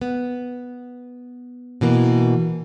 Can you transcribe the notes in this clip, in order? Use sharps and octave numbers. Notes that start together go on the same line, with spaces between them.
B3
B2 E3 A#3